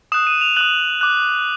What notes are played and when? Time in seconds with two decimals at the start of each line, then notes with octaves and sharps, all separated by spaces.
0.12 D#6 F#6 E7
0.27 D#7
0.41 F7
0.56 D#6 F#6 F#7
1.01 D6 F#6